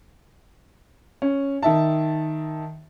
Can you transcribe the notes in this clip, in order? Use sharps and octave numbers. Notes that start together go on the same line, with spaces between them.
C#4
D#3 E5 A5